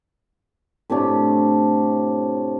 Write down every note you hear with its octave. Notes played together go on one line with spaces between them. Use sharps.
A2 C3 D4 G4